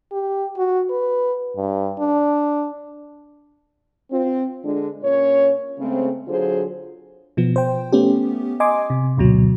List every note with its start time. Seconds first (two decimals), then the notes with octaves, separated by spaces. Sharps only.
0.12 G4
0.57 F#4
0.90 B4
1.57 G2
1.99 D4
4.11 C4 F4
4.63 D3 G#3 D4
5.03 A#2 C#4 C#5
5.79 C#3 G#3 A3 C4
6.28 D3 F#3 F4 G#4 C5
7.37 B2 F3 B3
7.56 C5 G5
7.92 A3 B3 C#4 G4
8.60 D#5 G#5 C6 D6
8.90 C3
9.17 G#1 D2 B2 F#3